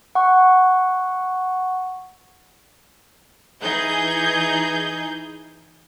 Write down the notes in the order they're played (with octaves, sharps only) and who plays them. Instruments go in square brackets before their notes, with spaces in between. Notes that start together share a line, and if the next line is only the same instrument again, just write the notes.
[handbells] F#5 C#6
[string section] E3 D#4 G#4 G6